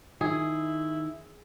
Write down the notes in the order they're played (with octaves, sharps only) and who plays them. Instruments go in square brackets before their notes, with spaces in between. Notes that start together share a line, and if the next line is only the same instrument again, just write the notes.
[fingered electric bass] D#3 [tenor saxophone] E4 [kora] G#4